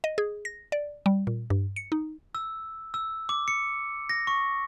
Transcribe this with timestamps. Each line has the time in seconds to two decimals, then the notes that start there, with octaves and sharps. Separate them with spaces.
0.04 D#5
0.18 G#4
0.45 A#6
0.72 D5
1.06 G3
1.27 A#2
1.50 G2
1.76 C#7
1.92 D#4
2.35 E6
2.94 E6
3.29 D6
3.48 C#7
4.09 A#6
4.27 C#6